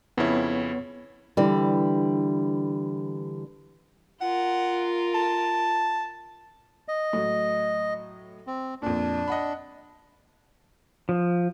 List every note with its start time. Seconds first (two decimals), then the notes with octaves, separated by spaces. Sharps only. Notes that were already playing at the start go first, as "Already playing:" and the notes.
0.18 F2 C#3 B3 E4 C#5
1.37 D3 E3 G3
4.21 F4 A#4 F#5
5.14 A5
6.88 D#5
7.13 A2 F#3
8.47 C4
8.82 F2 A#2 D4
9.28 D#5 F#5 B5
11.09 F3